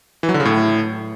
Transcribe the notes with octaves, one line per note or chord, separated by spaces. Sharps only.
E3
F#3
D3
C#3
A2